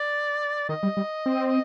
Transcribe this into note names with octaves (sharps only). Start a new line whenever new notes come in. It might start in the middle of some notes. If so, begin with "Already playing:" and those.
Already playing: D5
D#3 D#5
G3
G3
C4